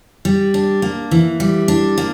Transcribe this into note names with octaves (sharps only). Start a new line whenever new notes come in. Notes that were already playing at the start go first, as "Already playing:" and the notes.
G3
D4
A#3
E3
G3
D4
A#3